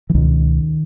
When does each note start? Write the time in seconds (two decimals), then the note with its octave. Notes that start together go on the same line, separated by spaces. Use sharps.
0.10 E3
0.15 C#2 B2 D#3